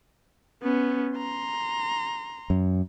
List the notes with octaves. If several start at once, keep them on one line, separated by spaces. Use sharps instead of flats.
B3 C#4
A#5 C6
F#2